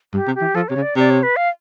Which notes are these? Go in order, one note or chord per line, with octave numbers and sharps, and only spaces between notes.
G2 G4
C3
G4
E3
F3 A4
C3 C#5
C#3
D5
C3 D5
C#5
B4
F5